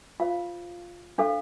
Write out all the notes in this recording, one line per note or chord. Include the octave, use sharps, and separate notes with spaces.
F4 C5 F5
D4 A4 C5 F5